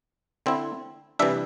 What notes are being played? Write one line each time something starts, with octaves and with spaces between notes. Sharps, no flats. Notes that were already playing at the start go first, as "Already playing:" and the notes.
D3 C4 E4
C3 E3 G3 D4 E5